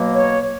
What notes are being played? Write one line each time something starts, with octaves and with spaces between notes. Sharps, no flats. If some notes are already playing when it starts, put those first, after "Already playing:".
Already playing: B2 F#3 A#3
C#5